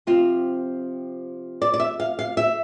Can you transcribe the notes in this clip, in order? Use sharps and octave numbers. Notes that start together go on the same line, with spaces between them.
C3 F3 C4 F4
D5
D5
E5
F5
F5
E5